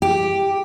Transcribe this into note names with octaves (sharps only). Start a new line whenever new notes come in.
G4